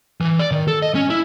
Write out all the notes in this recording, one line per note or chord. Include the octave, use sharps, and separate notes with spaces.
E3
D5
D#3
A4
D#5
C#4
E4